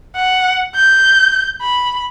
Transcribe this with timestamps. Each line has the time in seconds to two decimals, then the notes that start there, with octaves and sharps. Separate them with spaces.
0.16 F#5
0.76 G6
1.62 B5